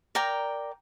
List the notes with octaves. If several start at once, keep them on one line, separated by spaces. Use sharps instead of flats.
A#4 D5 G5 A#5